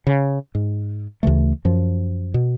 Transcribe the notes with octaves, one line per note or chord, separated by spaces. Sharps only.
C#3
G#2
D2 C#3 E3 A3
F#2 F3
B2